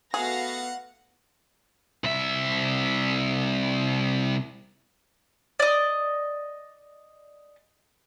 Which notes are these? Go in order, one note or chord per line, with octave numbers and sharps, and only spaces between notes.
A3 B3 F#4 G#4 F5 F#5 A#6
C2 E5
D5 D#5